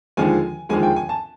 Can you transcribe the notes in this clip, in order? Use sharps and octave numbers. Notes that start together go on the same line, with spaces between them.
D#2 D3 F3 G#3 G#5
D#2 D3 F3 G#3 G#5
G5
G#5
A5